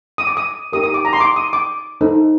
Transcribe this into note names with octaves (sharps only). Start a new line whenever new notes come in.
D#6
D6
D#6
D#4 G4 A#4 D#6
D#6
D6
A#5
C6
D6
D#6
D6
D#4 A4 C5